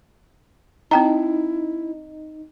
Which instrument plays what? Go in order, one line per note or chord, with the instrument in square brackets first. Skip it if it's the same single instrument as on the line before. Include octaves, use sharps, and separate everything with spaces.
[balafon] C4 G5 A#5 [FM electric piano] D#4 [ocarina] E4